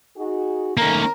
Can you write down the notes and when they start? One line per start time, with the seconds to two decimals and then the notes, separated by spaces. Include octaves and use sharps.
0.17 D#4 F#4 G#4
0.77 D#3 A3 A#3 C#4 A#4